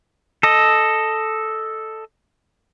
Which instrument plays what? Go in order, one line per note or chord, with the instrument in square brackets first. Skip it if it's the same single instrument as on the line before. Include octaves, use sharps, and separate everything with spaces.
[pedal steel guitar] A4 D#5